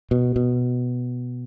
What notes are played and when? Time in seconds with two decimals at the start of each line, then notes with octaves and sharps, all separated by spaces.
0.11 B2
0.36 B2